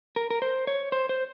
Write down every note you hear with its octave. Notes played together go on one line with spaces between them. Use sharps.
A#4
A#4
C5
C#5
C5
C5